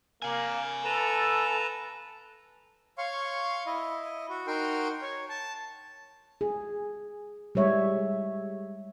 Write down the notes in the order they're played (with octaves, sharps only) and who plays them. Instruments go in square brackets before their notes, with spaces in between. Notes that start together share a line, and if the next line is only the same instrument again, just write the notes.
[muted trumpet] A#3 [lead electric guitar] F5 G#5
[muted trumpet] A4 [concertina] B4 A5 A#5
[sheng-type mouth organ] C#5 F5 C6 C#6
E4 D#5
F#4
D#4 F#4 A#4 G5 C6
C#5
A5
[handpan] G#4
G3 G#3 C#5 E5